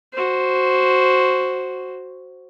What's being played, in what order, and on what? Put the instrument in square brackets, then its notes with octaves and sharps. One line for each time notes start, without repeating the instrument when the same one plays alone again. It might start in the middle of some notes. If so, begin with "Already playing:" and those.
[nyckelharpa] F#4 C5